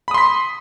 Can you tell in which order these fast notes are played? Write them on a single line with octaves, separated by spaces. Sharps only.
B5 D#6 C6 B6